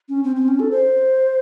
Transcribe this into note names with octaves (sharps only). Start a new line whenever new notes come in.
C#4
C4
C4
C#4
A4
C5